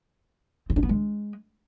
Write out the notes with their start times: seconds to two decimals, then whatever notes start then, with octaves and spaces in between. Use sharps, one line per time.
0.70 C4
0.76 D4
0.83 B3
0.89 G#3